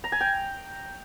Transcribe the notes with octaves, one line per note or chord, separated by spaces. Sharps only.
A#5
G#5
G5